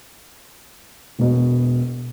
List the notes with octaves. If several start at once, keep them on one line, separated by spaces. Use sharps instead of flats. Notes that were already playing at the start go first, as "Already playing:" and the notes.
E1 B2